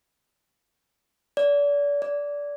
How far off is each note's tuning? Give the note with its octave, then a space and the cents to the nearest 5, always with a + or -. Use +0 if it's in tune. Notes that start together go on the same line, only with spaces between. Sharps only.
D5 -35
D5 -20